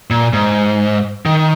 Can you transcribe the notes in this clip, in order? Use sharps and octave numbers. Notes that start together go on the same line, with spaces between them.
A#2
G#2
D#3